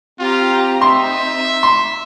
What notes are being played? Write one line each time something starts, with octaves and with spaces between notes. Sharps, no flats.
C4 F4 G4 A#5
D#4 E5 C6
C6